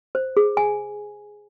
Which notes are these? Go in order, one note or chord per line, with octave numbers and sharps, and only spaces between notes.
C5
G#4
G#5